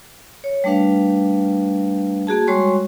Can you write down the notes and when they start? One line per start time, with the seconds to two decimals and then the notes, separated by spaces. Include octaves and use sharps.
0.44 C#5
0.64 G3 A3 D4 B4 F5
2.27 A#3 F#4 G#4 A5
2.47 G3 G#3 F#4 C#5 C6 C#6